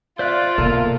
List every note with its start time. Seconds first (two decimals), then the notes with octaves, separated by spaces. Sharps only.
0.19 F4 C5 D5 E5 F#6
0.58 B2 A#3 A4